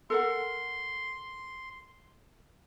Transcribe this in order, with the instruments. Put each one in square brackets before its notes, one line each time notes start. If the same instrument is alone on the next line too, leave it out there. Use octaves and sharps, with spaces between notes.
[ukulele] A4 A#4 F#5 [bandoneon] C6